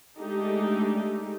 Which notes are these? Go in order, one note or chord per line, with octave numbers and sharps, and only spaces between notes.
G#3 A3 D4 D#4 G4 A4